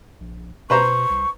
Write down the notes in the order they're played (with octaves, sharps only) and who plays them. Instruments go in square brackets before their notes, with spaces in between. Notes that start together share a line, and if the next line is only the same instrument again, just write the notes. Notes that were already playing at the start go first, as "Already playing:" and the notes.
[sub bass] A#1
[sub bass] B2 [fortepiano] B4 C5 A#5 [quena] C#6
[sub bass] C2